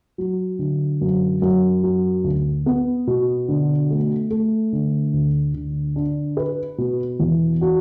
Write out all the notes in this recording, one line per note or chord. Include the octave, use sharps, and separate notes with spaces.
F#3
D3
F#2
F#2
F#3
D2
B3
B2
D3
A3
A3
D3
D2
D3
D4
B4
B2
E2
F#4